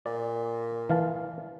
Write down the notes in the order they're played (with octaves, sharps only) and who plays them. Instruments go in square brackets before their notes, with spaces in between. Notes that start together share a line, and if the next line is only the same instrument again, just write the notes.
[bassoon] A#2 [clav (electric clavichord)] D5
[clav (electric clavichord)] E3 F5 A5